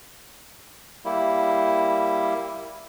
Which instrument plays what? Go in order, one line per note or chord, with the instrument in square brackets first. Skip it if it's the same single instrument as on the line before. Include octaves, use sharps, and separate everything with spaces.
[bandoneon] G3 A#3 E4